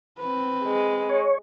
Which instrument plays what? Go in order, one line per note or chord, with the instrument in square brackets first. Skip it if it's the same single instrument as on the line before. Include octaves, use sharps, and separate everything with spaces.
[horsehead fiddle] C4 B4
[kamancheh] G#3
[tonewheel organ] C#5